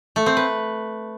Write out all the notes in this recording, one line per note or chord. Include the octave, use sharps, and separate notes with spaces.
A3
C4
B4